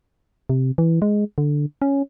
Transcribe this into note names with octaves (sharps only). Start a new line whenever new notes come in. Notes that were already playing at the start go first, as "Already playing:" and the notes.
C3
E3
G#3
D3
C#4